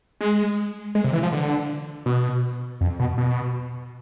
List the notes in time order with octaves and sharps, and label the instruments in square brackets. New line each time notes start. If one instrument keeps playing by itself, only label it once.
[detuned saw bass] G#3
G#3
C3
E3
F3
D3
B2
F2
B2
B2